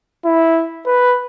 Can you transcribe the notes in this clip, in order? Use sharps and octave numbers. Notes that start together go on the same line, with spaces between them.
E4
B4